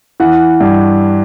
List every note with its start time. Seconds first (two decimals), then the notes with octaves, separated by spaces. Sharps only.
0.20 E3 F#5
0.60 G2